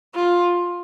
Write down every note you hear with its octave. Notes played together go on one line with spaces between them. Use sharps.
F4